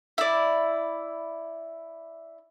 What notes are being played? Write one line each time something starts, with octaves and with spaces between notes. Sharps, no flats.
E4 D5